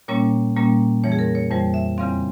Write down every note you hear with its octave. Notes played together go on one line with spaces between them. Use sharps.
A#2 G3 A#3 C#4 C#5
A#2 G3 A#3 C#4
F2 E3 G3 C#5
G#4
A#4
C#5
F2 E3 G3 C5
E5
E2 C#3 G3 C4 F5